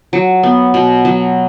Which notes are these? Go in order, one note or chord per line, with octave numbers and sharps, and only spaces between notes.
F#3
B3
B2
F#3